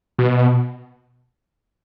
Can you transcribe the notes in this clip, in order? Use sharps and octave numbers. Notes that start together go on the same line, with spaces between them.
B2